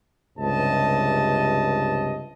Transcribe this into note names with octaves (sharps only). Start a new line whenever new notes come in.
C#2 G2 C3 D#5 A5